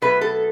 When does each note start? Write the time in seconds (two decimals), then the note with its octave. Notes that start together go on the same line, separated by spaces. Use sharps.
0.02 B2 F#3 A3 B4
0.21 A4